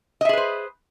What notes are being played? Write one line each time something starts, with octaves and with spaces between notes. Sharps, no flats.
G#4 B4 C5 D#5 E5